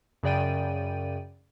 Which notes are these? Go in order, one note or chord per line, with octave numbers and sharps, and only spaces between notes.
F#2 C#3 D5 G5 D#7